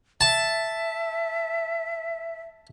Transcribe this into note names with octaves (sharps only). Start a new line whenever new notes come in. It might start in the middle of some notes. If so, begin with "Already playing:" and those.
E5 A5